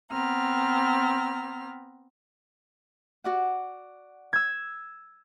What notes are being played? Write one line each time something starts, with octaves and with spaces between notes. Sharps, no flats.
B3 C4 A#5 F6
F#4 D5 F#5
E6 G#6